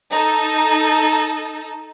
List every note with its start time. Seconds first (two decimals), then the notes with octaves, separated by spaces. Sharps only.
0.12 D#4 A4